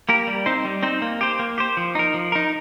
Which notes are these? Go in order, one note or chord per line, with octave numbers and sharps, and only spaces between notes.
A#3 G4 A#4
G3
C4 D#4 C5
G3
C4 D#4 C5
A#3
G4 C5
A#3
G4 C5
F3
D#4 A#4
F3
D#4 A#4